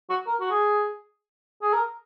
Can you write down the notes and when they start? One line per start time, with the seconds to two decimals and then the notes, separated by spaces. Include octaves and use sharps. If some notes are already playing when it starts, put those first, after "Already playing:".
0.10 F#4
0.27 A#4
0.41 F#4
0.51 G#4
1.62 G#4
1.73 A#4